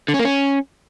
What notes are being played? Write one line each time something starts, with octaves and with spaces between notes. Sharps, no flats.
D3
C#4
A#3
C#4